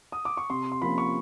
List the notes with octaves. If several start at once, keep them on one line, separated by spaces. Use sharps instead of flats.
D#6
D6
C#6
C3 C6
C6
F3 A#3 C#4 B5
C#6